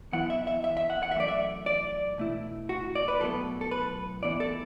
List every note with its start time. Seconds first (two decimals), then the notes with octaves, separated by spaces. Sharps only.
0.12 F#2 E3 B3 E4 F#5
0.30 E5
0.47 E5
0.64 E5
0.77 E5
0.90 F#5
1.03 F#5
1.11 E5
1.15 F#2 E3 A3 D5
1.28 E5
1.66 D5
2.18 B2 A3 E4
2.69 F#4
2.95 D5
3.08 B4
3.20 B1 A2 F#3 B3 A4
3.61 A4
3.71 B4
4.23 A2 E3 B3 E4 D5
4.40 A4